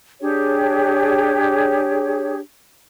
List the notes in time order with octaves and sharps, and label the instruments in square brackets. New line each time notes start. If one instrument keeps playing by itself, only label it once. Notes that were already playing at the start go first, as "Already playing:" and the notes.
[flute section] D4 G4 G#4 C#5